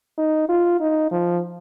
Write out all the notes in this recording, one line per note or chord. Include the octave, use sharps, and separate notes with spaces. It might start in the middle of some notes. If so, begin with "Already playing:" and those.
D#4
F4
D#4
F3